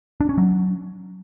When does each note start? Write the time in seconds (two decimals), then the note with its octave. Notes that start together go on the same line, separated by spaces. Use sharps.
0.21 D4
0.29 C#4
0.38 F#3